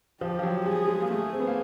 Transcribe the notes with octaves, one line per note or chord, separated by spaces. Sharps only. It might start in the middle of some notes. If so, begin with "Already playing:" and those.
F3 G4
F3
F#3
G3 G#4
G#3
A#3
A3 G#4
C4
B3
A#3